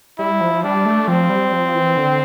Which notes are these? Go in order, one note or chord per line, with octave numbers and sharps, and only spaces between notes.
G3 E4
F3
G3 D4
A3
F3 C4
G3
F3
E3
D3